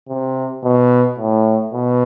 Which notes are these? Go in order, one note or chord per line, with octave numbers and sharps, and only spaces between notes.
C3
B2
A2
B2